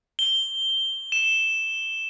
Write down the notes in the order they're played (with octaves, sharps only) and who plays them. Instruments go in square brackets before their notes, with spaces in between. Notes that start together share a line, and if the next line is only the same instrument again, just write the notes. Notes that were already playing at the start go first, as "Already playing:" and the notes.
[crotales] G7
E7